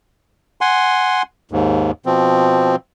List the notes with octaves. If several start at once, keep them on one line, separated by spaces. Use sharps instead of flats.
F#5 G#5 C6
D#2 G#2
B2 F3 C4